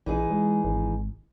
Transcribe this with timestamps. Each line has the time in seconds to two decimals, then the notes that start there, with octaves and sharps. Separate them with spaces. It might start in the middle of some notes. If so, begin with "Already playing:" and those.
0.06 A#1 E3 D#4 G#4
0.31 G#3
0.64 G#1